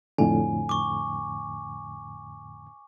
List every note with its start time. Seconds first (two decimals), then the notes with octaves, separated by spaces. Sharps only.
0.18 F2 A2 D3 G#5
0.69 C#6 D6